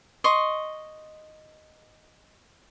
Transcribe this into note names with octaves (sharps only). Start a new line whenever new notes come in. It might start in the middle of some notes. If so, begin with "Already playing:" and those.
D#5 C6 C#6